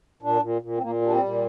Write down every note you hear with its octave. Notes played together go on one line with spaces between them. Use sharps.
A#2 D4
A#2
A#2
C4
A#2 A#3
G3 D4
C4
A#2